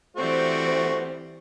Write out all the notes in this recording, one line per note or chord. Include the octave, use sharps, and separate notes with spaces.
E3 G3 A3 C4 F#4 C5